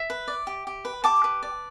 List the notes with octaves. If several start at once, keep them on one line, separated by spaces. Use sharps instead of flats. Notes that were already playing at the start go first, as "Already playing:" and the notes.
Already playing: E5
B4
D5
G4
G4
B4
G4 A5 D6
B4
D5